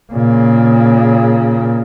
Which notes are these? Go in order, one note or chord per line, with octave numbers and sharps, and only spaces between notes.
A#2 C#3